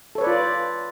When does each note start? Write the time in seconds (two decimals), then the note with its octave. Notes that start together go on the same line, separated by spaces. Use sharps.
0.15 A4
0.18 C#5
0.21 B4
0.24 D5
0.27 F4